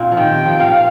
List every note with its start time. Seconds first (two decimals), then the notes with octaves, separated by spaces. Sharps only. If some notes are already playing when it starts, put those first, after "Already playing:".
Already playing: A#2 A#3 C4
0.12 F3
0.17 D#3 G5
0.31 C3
0.46 F3
0.59 A#2 A#3 F5